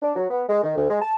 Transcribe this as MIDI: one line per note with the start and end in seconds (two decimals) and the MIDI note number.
0.02 0.14 62
0.16 0.26 54
0.30 0.42 59
0.49 0.60 56
0.63 0.76 51
0.76 0.86 38
0.90 1.00 56
1.01 1.15 81